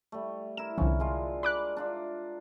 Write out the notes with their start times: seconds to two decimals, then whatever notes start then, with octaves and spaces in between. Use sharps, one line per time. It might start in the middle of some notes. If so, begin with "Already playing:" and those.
0.12 G3 A3
0.57 E4 A#4 E7
0.78 C2 D3 F3 C#4
1.00 G#3 D4 F4
1.43 D5 B5 D6 F#6
1.77 D4 F4 E5